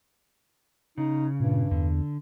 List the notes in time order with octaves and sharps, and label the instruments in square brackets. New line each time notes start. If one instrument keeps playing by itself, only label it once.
[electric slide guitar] C#3 [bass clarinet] D#4
[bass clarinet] G2 [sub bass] A#2
[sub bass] E2 [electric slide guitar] D3